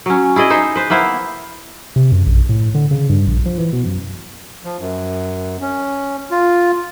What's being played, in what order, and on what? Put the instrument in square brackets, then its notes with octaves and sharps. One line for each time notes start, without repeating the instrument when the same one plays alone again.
[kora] F#3 C#4
E4 G#4 D5 D#5
D#4 C5 E5
B4 C5
A#3 B3 E4 C5
[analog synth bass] C3
F#2
A#1
A2
D3
C#3
G2
A#1
F3
E3
B2
F#2
[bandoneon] F3
F#2
C#4
F4